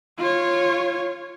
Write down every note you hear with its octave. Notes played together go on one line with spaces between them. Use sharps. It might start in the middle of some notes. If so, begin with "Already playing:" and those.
F4 C#5